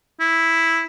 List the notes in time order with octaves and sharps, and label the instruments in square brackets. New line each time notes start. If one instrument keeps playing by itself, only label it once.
[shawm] E4